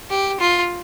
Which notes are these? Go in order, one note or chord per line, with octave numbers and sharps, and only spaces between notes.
G4
F4